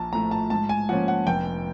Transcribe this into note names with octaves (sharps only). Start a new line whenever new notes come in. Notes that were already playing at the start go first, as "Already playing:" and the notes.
Already playing: A#1 A5 A#5
A2 F3 A3 A#5
A5
G#2 A5
G#5
F3 A#3 C#4 F#5
F#5
F1 G5